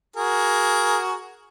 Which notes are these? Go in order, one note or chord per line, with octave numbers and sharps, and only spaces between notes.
F#4 G#4 A#4